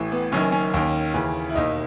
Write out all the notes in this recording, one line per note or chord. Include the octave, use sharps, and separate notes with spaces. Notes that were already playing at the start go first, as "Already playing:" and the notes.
Already playing: A1 A2 E3
B3
F#1 F#2 D#3 C#4
C#4
D#2 D#3
D#2 C#3 E3
E4
E1 D#2 D#3 D#4